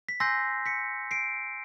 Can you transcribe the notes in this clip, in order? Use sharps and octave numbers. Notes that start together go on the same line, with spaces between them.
B6
G#5 C6 E6 G6 A#6 C7
B6 C#7
C7 D7